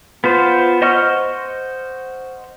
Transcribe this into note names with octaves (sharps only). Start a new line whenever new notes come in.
B3 F4 C5
C5 D#5 F#5 C#6 F6